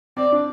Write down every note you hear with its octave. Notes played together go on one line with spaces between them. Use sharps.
C4 D5
D4